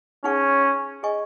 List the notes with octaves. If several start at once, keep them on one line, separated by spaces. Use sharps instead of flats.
C#4 D#4 G#4 F#5 C#6
G#4 D#5 G#5 C#6